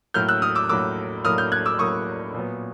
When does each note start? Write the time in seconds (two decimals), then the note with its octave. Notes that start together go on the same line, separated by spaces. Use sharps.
0.14 A2 F#3 A#3 F6 G6
0.29 E6 F#6
0.42 D#6 F6
0.55 D6 E6
0.69 A2 F#3 A#3 D6 E6
1.25 A2 F#3 A#3 D#6 F6
1.38 F6 G6
1.52 F#6 G#6
1.66 D6 E6
1.79 A2 F#3 A#3 C#6 D#6
2.34 A#2 F#3 B3